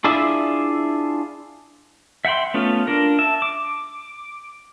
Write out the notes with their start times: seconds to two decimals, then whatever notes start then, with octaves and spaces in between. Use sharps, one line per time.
0.04 D4 E4 F4 G#4 D5 E5
2.25 E5 F#5 G5 B5 C6
2.54 A3 B3 C#4 F4
2.87 D4 F4 A#4
3.19 E5 A5
3.42 D6